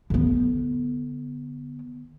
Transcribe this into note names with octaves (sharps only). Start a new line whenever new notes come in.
D3 B3